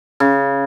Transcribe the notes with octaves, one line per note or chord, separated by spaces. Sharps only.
C#3